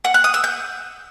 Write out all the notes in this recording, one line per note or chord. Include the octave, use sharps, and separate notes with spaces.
F#5
F#6
D#6
E6
G6